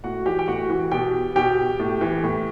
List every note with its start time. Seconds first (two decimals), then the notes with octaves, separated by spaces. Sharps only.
0.04 A2 F#4 F#5
0.26 E3 G4 G5
0.39 G5
0.48 A2 F#4 F#5
0.70 E3
0.92 B2 G4 G5
1.36 B2 G4 G5
1.79 A2
2.01 E3
2.23 A2